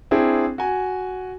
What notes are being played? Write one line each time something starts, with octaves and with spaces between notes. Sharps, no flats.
C4 D4 E4 G#4
F#4 G#5